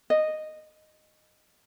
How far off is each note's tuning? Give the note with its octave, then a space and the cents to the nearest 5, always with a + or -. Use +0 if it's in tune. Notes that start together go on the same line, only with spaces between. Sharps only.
D#5 -10